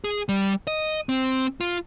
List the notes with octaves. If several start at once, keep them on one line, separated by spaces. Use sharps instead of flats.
G#4
G3
D#5
C4
F4